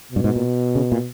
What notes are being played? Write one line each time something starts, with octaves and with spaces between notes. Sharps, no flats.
G2 B2
G#2
A#2
C#3
A#2